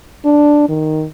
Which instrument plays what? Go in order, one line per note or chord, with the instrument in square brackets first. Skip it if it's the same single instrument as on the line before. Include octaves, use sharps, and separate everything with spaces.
[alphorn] D4
D#3